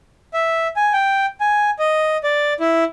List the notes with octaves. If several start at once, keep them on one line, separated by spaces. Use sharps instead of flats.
E5
G#5
G5
G#5
D#5
D5
E4